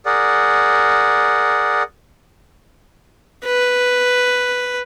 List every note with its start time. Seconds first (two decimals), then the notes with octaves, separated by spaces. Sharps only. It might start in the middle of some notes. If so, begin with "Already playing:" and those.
0.06 G#4 A#4 D5 F#5
3.46 B4